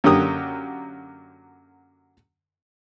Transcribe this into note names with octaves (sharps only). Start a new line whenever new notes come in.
F#2 D3 A#3 G4 D#6